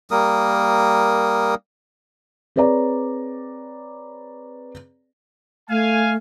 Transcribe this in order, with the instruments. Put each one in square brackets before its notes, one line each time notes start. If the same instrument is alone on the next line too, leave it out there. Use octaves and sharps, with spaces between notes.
[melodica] G3 A#3 A#4 D#6
[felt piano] C4 G#4 B4 C#5 D5 A#5
[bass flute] A3 [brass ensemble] F5 G#5